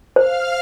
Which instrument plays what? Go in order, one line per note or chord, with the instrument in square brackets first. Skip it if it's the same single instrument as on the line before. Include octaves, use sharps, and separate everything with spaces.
[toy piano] C5 [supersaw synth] F5 F6